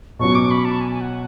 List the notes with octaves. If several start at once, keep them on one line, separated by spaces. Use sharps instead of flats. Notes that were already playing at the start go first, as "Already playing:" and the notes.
B2 F#3 C#4 F#4 C#6
D6
B5
A5
G#5
G#5
F#5